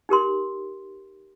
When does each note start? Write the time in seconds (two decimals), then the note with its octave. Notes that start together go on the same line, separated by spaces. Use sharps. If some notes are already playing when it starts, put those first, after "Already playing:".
0.09 D#4 G4 A#4 C6